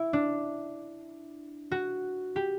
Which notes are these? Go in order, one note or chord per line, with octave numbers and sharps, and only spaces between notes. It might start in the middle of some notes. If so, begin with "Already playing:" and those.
Already playing: E4
D4
F#4
G4